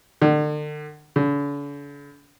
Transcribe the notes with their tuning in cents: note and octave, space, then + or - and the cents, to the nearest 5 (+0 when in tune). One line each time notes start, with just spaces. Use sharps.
D3 +40
D3 -45